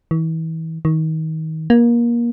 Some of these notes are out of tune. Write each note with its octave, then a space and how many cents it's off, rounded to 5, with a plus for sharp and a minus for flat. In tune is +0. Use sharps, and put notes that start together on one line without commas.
E3 -35
D#3 +30
A#3 +25